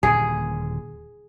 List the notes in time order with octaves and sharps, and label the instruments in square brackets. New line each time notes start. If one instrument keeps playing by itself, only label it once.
[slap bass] D#1 A#2 D3 [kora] G#4